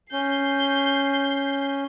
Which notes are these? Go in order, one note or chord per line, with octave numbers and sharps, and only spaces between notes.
C#4 G6 C7